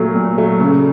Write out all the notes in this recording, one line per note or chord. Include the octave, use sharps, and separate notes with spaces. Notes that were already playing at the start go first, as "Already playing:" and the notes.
Already playing: A#2 F#3 A3
A#2
F#3 A3
C#3